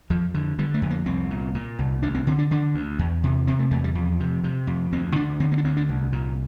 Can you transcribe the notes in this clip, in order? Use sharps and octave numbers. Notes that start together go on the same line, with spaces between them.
F2 F3
D3
D3 G3
A3
F2
A#3
C2 C4
A#2
A#2
C2
D2 D4
C4
D3 C4
D4
D3 D4
D2
E2
C3
C3 C4
A3
E2 A3
G3
F2
C3
C3
F2
D2 C4
D3 D4
D3 C4
A#3
D4
D2 C4
D4
C2
A#2